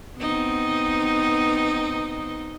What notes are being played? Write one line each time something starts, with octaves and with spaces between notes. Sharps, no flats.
B3 C4 D#4